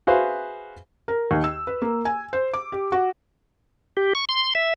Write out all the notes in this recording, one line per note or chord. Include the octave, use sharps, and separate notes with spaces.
F#4 G#4 B4 C5 E5 F5
A#4
D#2
E6
B4
A#3
G#5
C5
D6
G4
F#4
G4
C#6
C6
E5